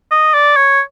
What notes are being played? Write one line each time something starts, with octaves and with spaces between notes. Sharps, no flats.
D#5
D5
C#5